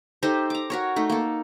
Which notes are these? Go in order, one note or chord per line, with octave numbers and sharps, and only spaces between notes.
D#4 G4 A4 C5
A#5 D6
F#4 A#4 C#5
A3 D#4
A#3 A4